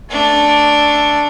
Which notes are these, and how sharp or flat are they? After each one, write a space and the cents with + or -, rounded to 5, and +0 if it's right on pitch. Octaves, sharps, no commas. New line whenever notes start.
A3 +0 D4 +0